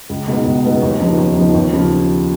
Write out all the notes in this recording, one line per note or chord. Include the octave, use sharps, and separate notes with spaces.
C#2
B2 G#3 B3 D#4
C#2
B2 G#3 B3 D#4
D#2
C#3 F3 B3 D#4
D#2
C#3 F3 B3 D#4
D#2
C#3 F3